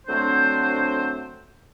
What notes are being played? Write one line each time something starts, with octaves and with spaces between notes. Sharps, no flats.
D3 F#3 A3 C4 D4 C5